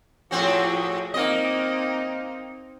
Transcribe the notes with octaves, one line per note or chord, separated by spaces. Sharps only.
A2 F3 C4 F#4 G#4
A#3 C4 D#4 D#5